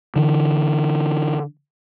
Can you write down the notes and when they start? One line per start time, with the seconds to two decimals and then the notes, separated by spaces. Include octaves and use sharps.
0.16 D3 E3